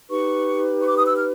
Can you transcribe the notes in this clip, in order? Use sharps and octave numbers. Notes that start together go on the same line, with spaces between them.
D#4 G4 B4 C#6
C#6
D6
D#6
E6
F6